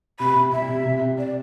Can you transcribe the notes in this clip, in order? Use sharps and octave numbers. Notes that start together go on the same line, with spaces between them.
C3 B5
C3
C2 E5
C3
C3
C3
D5